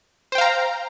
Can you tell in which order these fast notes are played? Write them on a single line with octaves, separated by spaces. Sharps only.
C5 G5 F5 A#5